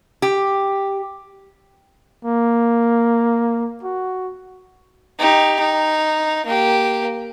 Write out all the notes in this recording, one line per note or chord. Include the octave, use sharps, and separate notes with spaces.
G4
A#3
F#4
D#4 G4
D#4
A#3 G4